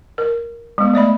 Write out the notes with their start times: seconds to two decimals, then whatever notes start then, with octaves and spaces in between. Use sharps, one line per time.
0.18 A#4
0.78 G#3 B3
0.94 A3 D5 E5 B5